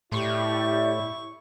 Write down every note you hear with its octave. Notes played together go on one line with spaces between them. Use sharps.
A2 E4 G4 D5 C#6